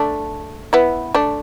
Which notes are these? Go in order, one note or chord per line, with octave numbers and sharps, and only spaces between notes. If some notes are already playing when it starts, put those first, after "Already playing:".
Already playing: A3 D4
B3 E4
A3 D4